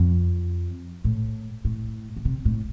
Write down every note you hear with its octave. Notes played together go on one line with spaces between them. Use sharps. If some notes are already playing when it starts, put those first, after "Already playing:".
Already playing: F2
A2
A2
B2
C3
A2